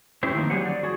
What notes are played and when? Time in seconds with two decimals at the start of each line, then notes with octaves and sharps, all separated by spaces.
0.23 C#4 E4 G4 C5
0.35 D#3 F3 G#3 A#3 D#4
0.50 F#3 G3 G4 G#4 C5 F#5
0.66 D5
0.83 F#4 G#4